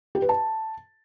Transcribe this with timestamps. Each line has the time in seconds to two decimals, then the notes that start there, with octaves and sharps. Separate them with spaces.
0.15 G4
0.22 B4
0.29 A5